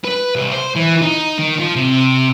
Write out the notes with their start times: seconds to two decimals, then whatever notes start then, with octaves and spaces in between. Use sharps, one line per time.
0.04 B4
0.35 C2
0.52 C5
0.76 E3
1.02 D#4
1.39 D#3
1.60 F3
1.76 C3